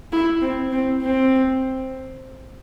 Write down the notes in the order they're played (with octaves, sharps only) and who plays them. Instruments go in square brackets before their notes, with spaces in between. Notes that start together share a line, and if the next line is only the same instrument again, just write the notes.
[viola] E4
C4
C4
C4